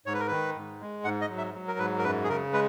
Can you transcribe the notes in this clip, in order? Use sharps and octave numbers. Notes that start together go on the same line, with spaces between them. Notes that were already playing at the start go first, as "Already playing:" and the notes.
G#2 C#5
B4
A#4
D#3 B4
G#2
G#3
G#2 F#5
D#5
F#3
E5
F#3
A#4
G#2 B4
A#4
F#2 B4
G#4
C#3 A#4
G#3 B4